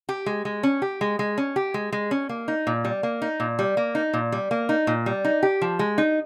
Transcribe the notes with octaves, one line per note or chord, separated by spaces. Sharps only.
G4
G#3
G#3
C#4
G4
G#3
G#3
C#4
G4
G#3
G#3
C#4
A#3
D#4
A#2
G3
A#3
D#4
A#2
G3
A#3
D#4
A#2
G3
A#3
D#4
A#2
G3
D#4
G4
F3
G#3
D#4